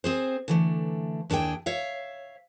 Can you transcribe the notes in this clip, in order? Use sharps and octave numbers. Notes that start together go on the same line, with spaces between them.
C4 G#4 C5
D3 E3 A3
D#2 D4 E4 G#4 G5
C#5 E5 F5